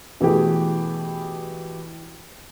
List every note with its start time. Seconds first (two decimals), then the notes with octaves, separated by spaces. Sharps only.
0.20 B2 E3 A3 G4 G#4